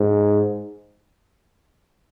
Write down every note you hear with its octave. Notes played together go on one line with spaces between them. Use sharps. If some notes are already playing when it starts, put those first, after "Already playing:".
Already playing: G#2